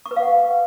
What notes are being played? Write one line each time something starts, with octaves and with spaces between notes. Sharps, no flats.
C#6
B4
F5
F#5